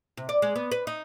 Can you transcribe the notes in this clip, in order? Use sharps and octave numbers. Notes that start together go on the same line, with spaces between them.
C3
D5
G#3
B3
B4
D#4